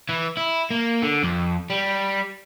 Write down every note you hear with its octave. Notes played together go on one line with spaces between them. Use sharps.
E3
E4
A#3
D3
F2
G3